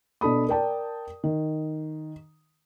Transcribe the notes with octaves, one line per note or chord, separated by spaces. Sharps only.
B2 D4 A4 B5 D#6
A#4 D5 G5 A5
D#3